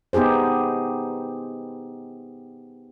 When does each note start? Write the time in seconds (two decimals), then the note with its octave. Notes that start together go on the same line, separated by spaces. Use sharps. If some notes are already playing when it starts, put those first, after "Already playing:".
0.13 B3 D#4 G4 G#4 C5